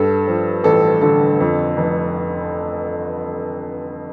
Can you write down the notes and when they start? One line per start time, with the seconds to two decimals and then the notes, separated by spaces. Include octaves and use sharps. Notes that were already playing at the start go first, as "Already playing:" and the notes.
Already playing: G2 A4
0.27 F3
0.64 A1 A4
1.01 D3 A4
1.40 F2
1.77 F1